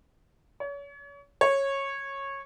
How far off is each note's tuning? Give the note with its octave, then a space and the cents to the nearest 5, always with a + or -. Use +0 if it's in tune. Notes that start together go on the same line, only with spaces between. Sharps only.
C#5 +35
C#5 -15